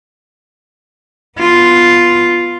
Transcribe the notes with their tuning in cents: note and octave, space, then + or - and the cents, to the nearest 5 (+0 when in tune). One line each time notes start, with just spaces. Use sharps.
B3 +0 F4 +0